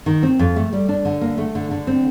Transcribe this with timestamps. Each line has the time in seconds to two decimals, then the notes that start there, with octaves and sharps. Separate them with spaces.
0.06 D#3
0.23 C4
0.39 F2
0.56 A3
0.73 G3
0.89 D4
1.05 D3
1.21 A#3
1.38 A3
1.55 D3
1.71 D3
1.87 C4